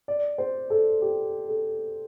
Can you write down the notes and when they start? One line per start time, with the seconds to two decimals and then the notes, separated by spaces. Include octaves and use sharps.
0.08 D5
0.38 C5
0.70 A4
1.02 G4
1.49 A4